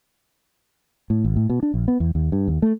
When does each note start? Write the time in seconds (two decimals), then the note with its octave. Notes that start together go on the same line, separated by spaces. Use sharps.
1.10 A2
1.24 G#1
1.36 A2
1.50 B2
1.63 D4
1.74 A#1
1.88 B3
2.00 E2
2.15 D#2
2.32 G2
2.48 D#2
2.62 A3